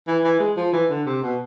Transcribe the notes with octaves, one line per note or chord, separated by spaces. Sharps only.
E3
E3
G#3
F3
E3
D3
C3
B2